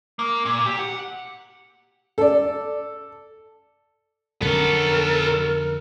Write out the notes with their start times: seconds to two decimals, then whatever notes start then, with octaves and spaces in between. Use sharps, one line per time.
0.19 A#3
0.45 A#2
0.66 G4
0.79 F#5
2.18 A4 D5
4.42 F2 D3 F#3 B3 C#4 A4 A#4